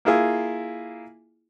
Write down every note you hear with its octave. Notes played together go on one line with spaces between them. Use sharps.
A#3 E4 F4 G#4